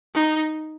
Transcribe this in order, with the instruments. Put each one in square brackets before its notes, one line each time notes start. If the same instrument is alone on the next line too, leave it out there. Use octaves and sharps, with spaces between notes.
[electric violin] D#4